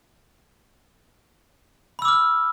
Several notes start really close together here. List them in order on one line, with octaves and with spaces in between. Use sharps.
B5 E6 D6 F6